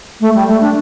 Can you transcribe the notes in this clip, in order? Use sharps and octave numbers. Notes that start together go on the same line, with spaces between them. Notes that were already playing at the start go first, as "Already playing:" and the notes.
A3
G3
A3
D4